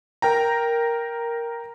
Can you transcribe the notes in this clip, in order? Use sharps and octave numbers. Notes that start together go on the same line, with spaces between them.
A#4 G5 A#5